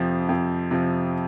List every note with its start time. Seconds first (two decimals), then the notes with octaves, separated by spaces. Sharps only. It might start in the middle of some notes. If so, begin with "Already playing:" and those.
Already playing: F2 C3 F3
0.29 F2
0.71 C3 F3